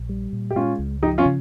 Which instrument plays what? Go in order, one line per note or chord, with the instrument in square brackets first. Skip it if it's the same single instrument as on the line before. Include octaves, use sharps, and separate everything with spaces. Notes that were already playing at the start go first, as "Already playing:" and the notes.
Already playing: [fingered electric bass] A#1
G3
A#2
[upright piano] G4
[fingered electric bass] G#3 [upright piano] C#4 F4
[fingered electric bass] C#2
[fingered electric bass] F3 [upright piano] D#4 G4
[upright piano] C#4 F4
[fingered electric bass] C#3